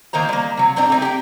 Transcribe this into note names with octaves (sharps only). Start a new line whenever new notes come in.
A2 D#3 A#3 C5 A#5
G3 A#3
C3 F#3
G2 B2 C4 D4 A#5
A3 C4 D#4
G4 G5